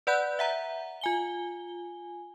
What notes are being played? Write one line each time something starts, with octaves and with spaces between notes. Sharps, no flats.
B4 D5 F#5 B5 F#6 G6
E5 F#5 A#5
F4 G#5 G7